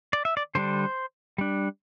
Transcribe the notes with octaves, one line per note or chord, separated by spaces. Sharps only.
D5
E5
D5
D3 G3 D4 C5
G3 D4